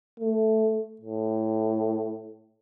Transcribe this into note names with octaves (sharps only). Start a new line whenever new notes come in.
A3
A2